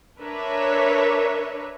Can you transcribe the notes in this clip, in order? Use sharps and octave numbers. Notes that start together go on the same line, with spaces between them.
D4 A#4 B4 C#5 E5